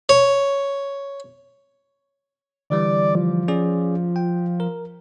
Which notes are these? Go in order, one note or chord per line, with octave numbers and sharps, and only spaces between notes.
C#5
D3 E3 G3 D5
F3
C#4 G#4 D5
G5
A#4